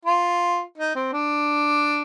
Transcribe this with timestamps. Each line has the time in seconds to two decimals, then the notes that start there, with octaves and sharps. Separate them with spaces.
0.05 F4
0.77 D#4
0.95 C4
1.13 D4